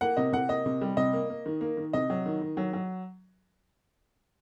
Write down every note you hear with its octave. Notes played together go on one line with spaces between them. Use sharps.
A#3 F#5
C3 D#5
C3 F#5
A#3 D#5
C3
G3
C3 D#5
A#3
A#3
D#3
A#3
D#3
C3 D#5
F#3
D#3
D#3
F#3
F#3